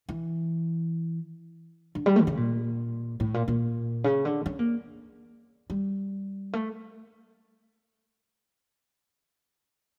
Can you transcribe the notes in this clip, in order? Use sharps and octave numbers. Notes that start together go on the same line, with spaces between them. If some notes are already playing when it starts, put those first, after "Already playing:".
E3
D3
G3
A3
D3
C#3
A#2
A2
A#2
A#2
C#3
D3
C#4
A#3
G3
A3